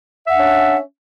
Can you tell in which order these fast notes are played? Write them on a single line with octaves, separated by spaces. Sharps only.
E5 F#5 D4 C#4